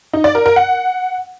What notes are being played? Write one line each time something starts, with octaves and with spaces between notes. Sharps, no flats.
D#4
D5
A#4
A#4
F#5